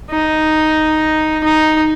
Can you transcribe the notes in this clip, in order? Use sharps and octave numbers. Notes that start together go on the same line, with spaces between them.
D#4
D#4